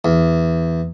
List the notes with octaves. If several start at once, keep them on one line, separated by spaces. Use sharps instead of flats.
E2